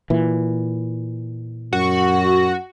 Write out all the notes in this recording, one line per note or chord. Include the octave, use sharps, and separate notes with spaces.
A#2 E3
F#2 F#4